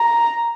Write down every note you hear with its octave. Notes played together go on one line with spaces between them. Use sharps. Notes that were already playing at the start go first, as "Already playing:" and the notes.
Already playing: A#5